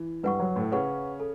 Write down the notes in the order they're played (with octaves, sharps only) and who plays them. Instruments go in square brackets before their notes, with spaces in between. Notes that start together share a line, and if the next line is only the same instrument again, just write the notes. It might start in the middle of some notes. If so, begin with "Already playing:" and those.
Already playing: [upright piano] E3
[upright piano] G2 G3 [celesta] B4 F#5 C#6
[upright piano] F#3
A2 A3
[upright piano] C#3 C#4 [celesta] B4 F#5 C#6
[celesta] A4